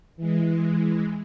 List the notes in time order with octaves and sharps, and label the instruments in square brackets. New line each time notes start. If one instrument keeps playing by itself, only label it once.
[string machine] E3 G#3